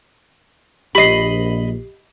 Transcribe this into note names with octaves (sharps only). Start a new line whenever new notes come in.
A#1 G4 D#5 B5 C7